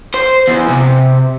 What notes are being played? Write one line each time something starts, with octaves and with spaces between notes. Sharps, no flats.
C5
E2
C3